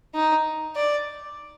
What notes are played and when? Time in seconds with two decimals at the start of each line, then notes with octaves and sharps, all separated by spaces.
0.15 D#4
0.76 D5